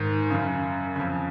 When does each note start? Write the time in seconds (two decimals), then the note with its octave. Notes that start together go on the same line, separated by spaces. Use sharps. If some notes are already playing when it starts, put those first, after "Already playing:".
Already playing: G#2 D#3
0.30 F#2 C#3
0.96 F2 C#3